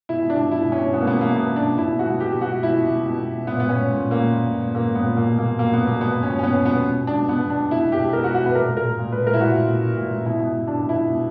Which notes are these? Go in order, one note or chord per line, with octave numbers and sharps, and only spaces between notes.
B2 E4
B2
D4
B2
B2 E4
B2
C#4
B2
B2 B3
A#3
B2 B3
B2 A#3
B2 B3
B2
D4
B2
B2 E4
B2
F#4
B2
B2 G4
B2
F#4
B2
B2 E4
B2
B2
B2
B2
B2
A#2 B3
A#2 B3
C#4
A#2
A#2
A#2
A#3
A#2
A#2
A#2
A#2
A#2 A#3
A#2
B3
A#2
B2 A#3
B2
A#3
B2
B2 A#3
B2 B3
B2 A#3
B2 B3
B2
C#4
B2
C#4
B2 B3
B2
B3
B2
B2
B2
D4
B2
B2 B3
B2
D4
B2
B2 E4
B2
G4
B2
B2 A#4
F#4
B2
F#4
B2 B4
A#2 A#4
A#2
A#4
A#2
A#2
A#2 B4
A#2 A#4
E4
A#2 F#4
A#2
A#2
A#2
A#2
A#2
B2 E4
B2
B2
B2 D4
B2
E4
B2
B2